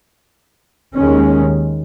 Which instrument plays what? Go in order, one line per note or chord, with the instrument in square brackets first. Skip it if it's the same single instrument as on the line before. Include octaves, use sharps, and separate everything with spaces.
[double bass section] D#2 D#3 G#3 C#4